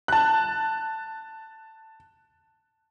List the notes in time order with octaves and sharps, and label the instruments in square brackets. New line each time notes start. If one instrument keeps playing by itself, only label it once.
[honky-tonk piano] A5 F#6